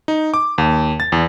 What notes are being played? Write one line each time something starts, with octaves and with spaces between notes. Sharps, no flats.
D#4
D6
D#2
A6
E2